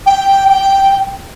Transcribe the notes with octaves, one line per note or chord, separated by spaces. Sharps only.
G5
G5